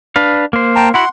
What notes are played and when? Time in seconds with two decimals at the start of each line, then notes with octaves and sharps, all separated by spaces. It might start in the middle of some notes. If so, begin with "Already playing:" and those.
0.16 D4 B4 F5
0.53 A#3 C5
0.76 G5 A5 A#5
0.94 E4 F#4 F#5 B5 C6